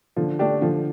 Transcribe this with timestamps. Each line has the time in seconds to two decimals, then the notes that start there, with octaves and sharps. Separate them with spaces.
0.16 D3 F3
0.39 A3 D4 G4
0.61 D3 F3